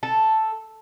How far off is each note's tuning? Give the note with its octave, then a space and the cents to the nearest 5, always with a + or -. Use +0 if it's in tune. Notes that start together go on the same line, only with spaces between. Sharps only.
A4 +0